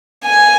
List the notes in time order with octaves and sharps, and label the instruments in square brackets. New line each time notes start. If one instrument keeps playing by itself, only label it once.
[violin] G#5